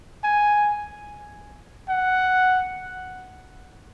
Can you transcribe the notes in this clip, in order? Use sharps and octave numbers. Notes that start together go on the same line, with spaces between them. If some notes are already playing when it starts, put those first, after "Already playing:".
G#5
F#5